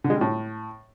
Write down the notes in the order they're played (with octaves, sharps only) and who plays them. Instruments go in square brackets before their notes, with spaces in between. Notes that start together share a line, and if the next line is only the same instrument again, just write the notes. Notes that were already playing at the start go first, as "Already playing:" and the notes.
[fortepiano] D3
G#3
G3
A2